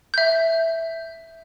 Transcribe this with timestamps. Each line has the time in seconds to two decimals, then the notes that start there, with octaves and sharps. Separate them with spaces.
0.14 E5 G6